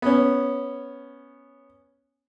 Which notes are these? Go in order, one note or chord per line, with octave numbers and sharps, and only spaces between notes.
B3 C#4